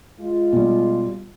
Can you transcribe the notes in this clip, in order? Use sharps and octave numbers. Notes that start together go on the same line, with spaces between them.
G#3 F4
B2 G3